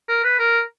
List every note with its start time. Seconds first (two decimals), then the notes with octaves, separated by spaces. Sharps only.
0.08 A#4
0.24 B4
0.39 A#4